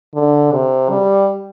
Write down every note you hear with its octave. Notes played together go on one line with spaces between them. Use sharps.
D3
C3
G3